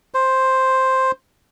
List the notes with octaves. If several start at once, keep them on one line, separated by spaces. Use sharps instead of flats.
C5